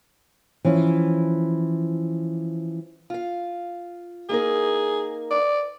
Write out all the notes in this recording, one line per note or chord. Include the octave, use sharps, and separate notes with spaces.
E3 F3 C#4
F4 F5
A#3 D#4 G#4 A#4
D5